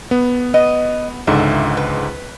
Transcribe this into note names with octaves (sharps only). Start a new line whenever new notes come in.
B3
B3 D#5
C#2 G#2 D3 E5
B4